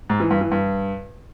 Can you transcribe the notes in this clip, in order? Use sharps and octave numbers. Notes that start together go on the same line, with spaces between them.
G#2
E3
G2
E3
G2